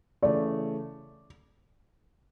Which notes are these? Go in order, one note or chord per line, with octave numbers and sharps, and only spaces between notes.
C#3 E3 A3 D5